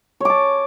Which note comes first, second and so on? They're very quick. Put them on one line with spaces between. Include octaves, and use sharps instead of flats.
C#5 D6 A5